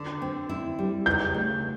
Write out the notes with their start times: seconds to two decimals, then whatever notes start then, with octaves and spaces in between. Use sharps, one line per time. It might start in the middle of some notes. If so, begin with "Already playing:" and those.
Already playing: D3
0.22 C4
0.49 E4
0.79 G3
1.06 C#3 G6
1.34 A3